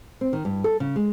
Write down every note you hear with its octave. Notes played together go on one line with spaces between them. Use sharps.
C4
D#3
G2
A4
C#3
G#3